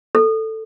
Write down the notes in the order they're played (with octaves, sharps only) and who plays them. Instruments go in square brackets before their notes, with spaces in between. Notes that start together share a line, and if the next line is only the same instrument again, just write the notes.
[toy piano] A4